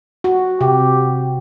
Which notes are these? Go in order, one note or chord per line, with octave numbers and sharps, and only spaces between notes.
F#4
C3 G4